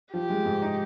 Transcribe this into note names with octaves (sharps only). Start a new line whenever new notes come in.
F3 G4
G#3
G#2
D#4